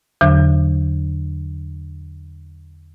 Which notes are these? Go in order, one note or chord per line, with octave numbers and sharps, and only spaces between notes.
E2 D3 F#3